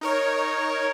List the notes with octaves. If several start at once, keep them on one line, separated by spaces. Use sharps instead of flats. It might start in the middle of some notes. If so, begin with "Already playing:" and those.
D#4 A#4 C#5